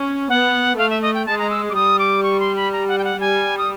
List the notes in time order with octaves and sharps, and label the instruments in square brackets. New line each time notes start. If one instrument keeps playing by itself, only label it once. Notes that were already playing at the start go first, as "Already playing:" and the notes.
Already playing: [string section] C#4
[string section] B3 [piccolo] F#5
[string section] A3 [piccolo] F5
[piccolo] E5
D#5
G5
[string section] G#3 [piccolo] A5
[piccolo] A#5
E6
D6
[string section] G3 [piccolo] D#6
[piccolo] D6
C#6
C6
B5
A#5
F#5
G5
F#5
[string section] G3 [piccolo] G#5
[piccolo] D#6